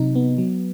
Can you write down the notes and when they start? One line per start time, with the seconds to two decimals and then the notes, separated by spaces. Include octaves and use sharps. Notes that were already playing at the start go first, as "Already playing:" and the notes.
Already playing: C3 F#3 D#4
0.15 B3
0.38 F#3